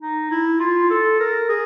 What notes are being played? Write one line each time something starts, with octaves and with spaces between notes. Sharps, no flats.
D#4
E4
F4
A4
A#4
G#4